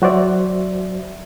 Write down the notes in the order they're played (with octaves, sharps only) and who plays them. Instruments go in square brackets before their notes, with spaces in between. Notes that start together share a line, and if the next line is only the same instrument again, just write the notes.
[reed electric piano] F#3 F#4 C5 D5 E5